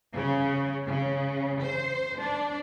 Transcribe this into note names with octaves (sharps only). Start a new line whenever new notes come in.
C#3
C#3
C5
D4